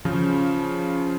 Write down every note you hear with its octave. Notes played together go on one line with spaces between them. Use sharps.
C#3 F3